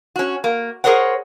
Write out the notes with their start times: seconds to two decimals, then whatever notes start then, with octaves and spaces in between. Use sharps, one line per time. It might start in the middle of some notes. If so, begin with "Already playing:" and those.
0.16 C#4 F#4
0.44 A#3
0.84 G#4 A#4 C5 C#5 F#5